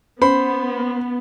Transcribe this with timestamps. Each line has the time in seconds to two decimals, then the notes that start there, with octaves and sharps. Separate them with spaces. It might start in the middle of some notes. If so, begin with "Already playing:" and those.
0.22 B3 C#4 C5 B5